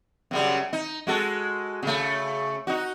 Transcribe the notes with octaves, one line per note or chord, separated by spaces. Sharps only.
F#2 C#3 G3
D#4
G#3 F#4 A4
C#3 A3
D#4 F#4